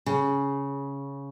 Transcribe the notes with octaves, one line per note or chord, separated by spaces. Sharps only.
C#3